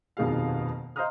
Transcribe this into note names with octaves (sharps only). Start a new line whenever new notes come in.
D#1 F2 B2 D#3 G#4 F5
C5 D#5 F5 A#5 D#6 F6